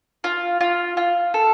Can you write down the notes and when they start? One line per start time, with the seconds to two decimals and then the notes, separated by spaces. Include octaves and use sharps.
0.24 F4
0.61 F4
0.97 F4
1.34 A4